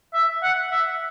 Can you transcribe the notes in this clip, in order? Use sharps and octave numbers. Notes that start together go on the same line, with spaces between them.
E5
F#5
E5